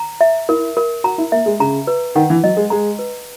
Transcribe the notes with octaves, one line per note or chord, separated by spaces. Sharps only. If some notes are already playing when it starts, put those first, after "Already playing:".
Already playing: A#5
E5
E4 A#4
A#4
F#4 A#5
E4
A#3 E5
G#3
C#3 A#5
B4
D#3 F#5
E3
F#3 D#5
G#3
G#3 A#5
B4